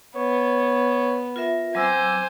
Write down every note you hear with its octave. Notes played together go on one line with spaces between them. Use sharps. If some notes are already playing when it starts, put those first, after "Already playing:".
B3 C#5
F4 A#4 E5
F#3 C4 C5 G#5 D6 E6